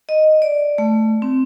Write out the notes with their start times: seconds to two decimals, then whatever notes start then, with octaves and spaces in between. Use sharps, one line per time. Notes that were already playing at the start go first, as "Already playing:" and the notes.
0.09 D#5
0.42 D5
0.78 A3
1.22 C4